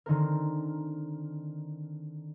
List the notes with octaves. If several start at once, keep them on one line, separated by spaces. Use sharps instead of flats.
D3 D#3 C4 A#4